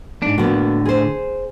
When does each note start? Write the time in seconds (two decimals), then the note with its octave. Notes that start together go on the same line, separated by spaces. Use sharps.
0.22 G#2 D4
0.38 A2 D3 A#3 B3 F#4
0.85 G#4 C5